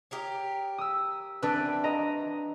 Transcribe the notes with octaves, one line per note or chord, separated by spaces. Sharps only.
G4 A#4 C#5
D#6 E6
E3 G3 C4 D4 B4
D#5 A#5